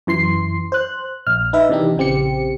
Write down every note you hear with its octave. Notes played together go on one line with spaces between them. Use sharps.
F#2 E3 C6 C7
C5 F#6
A#1 F6
D#4 B4 E5
C3 D#3 E3 D4 D#4 G4
A#1 C#3 C4 G4 C#7